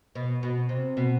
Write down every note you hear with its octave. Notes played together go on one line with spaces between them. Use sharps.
B2
B2
C3
B2